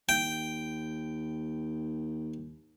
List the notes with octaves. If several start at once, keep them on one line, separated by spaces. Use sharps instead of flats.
D#2 G5